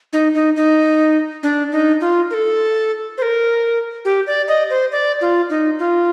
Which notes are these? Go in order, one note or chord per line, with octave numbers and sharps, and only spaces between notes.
D#4
D#4
D#4
D4
D#4
F4
A#4
A4
C5
A#4
G4
D5
D#5
C5
D5
F4
D#4
F4